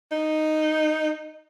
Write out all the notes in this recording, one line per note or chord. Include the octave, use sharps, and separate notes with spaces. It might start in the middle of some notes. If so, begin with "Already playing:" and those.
D#4